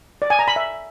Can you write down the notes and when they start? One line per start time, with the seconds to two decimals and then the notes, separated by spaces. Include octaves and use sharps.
0.22 D5
0.30 G#5
0.39 A#5
0.48 B5
0.56 E5